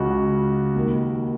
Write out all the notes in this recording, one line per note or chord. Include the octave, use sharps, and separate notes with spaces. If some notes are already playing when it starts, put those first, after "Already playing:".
Already playing: C#2 C#3 F#4
D#2 D#3